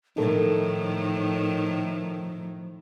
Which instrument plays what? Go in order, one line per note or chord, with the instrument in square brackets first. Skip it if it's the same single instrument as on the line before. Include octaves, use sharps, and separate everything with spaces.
[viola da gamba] A2 D#3 [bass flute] F3 [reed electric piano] D#4 A4 A#4